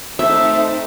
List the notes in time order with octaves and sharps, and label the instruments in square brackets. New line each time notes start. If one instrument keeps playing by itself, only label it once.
[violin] A3 C4 [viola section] D#4 [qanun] E5